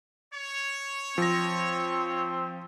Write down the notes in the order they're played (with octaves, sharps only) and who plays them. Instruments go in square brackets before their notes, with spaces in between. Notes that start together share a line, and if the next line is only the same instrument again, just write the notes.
[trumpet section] C#5
[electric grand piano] F3 A#6 [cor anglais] C4